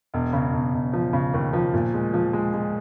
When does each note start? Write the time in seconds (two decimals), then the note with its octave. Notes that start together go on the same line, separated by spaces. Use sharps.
0.14 E1
0.33 C#3
0.53 E1
0.73 E1
0.93 F3
1.13 C#3
1.34 D#2
1.53 F3
1.74 A#2
1.94 G#3
2.14 F3
2.33 G#3
2.54 G#3